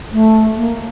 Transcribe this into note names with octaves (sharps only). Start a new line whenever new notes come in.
A3
A#3